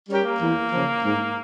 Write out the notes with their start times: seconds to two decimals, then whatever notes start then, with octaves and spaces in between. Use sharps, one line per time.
0.09 G3 C#4 G4 A#4
0.24 A#3
0.40 E2
0.72 C#3 F3
1.04 G#2